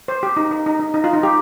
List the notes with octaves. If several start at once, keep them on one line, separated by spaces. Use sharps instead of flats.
C5
G4
D#4
D#4
D#4
D#4
D#4
F4
D#4
G4